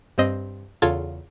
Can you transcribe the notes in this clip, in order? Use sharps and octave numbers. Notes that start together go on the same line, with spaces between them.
G2 C4 D#5
E2 C#3 F4 A4 G#6 A6